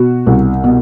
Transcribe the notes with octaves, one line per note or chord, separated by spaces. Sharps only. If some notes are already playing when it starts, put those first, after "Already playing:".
Already playing: B2 F#4
C2
B2